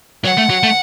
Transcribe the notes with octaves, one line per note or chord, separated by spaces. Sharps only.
F#3 F#5
A3
F#3
A3